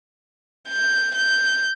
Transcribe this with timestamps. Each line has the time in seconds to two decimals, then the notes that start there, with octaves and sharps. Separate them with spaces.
0.69 G6
1.14 G6